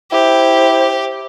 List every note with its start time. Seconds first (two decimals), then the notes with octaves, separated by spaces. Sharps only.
0.12 E4 G4 C5